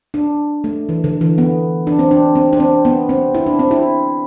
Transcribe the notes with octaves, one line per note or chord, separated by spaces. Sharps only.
D4
A3
E3
D3
E3
B3
D4
C4
D4
C4
D4
C4
B3
C4
E4
D4
C4
E4